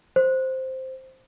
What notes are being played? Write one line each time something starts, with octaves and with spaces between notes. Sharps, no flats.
C5